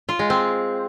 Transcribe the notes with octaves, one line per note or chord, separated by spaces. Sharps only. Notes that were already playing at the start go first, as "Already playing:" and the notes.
F4
G#3
C4